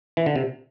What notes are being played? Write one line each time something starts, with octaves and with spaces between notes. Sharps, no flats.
E3
D3
C3